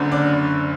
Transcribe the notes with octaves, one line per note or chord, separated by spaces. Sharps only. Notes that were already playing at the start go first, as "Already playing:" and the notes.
Already playing: F#1 F#2 D3
D5